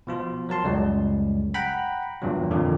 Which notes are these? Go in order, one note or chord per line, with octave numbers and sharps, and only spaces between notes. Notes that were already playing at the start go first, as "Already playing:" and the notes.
B2 F3 F4
F#3 A#4 A5 C6
C#2 F#2 G3 G#3
F#5 G5 A#5 B5
E2 G2 A#2 C#3 F#3
F2 A#2 D3 D#3